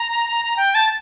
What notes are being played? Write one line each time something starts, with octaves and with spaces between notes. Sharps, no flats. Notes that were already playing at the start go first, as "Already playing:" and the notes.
Already playing: A#5
G5
A5